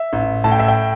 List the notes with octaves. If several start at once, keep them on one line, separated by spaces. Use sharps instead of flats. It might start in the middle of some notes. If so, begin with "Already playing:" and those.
Already playing: E5
A1
A2 A5
G5
E5
G5